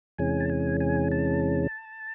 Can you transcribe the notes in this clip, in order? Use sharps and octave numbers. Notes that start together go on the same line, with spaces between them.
E2 C3 E3 G#3 C#4 G#5
A5
G#5
G#5
A5